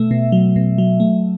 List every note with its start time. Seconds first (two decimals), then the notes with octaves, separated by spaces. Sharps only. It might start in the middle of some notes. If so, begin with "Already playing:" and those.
Already playing: B2 A3 E5
0.11 B2
0.32 F#3
0.56 B2
0.78 F#3
1.00 A3